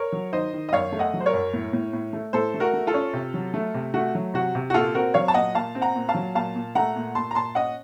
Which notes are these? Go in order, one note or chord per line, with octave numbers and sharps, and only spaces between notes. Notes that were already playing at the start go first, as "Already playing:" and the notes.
Already playing: A#4 C#5
F#3
D#3 C5 D#5
D#3
D#5
F#2 C#5 F5
A3
D#5 F#5
F#3
C5
A#4 C#5
F#2
A2
A2
A2
A3
A2 A4 C5
A3
F#4 A#4
A3
F4 A4
C#4
C3
F#3
A3
C3
A3 F#4
F#3
C3 F#4
C3
F#4
A#2 F4 A4
C4 F#4 A#4
F#3 C#5 F5
A5
A#2 D#5 F#5
A#2 F5 A5
C4
F#5 A#5
A#2
F5 A5
F#3
A#2 F5 A5
A#2
A3 F#5 A#5
A#2
A#2 A5 C6
A#5
A#2 A5 C6
C#4 D#5 F#5